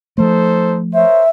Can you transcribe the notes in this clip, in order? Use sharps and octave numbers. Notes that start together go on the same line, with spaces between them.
F3 A3 D#4 A4 C5
A#4 C5 C#5 E5